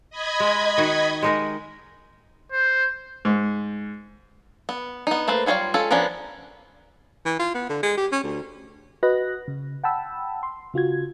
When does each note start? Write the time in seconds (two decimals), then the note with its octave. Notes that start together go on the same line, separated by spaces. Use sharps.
0.10 D#5 B5 G#6
0.40 G#3
0.78 D#3 F#4
1.22 G#3 D#4 A#4
2.52 C5
3.25 G#2
4.69 B3
5.07 B3 D#4
5.28 A3 A#3 B4 C5
5.46 F#3 G3 F4 C#5 F5
5.74 G#3 C#4 F4 A4
5.91 F3 B3 C#4 D4 A#4
7.25 E3
7.39 F4
7.54 B3
7.69 D3
7.83 G#3
7.97 G4
8.12 C#4
8.23 D2
9.03 F#4 B4 D#5 F#6 A#6
9.48 C#3
9.84 F#5 G5 A5 B5 E6
10.43 C6
10.74 C#3 F4 F#4 G#6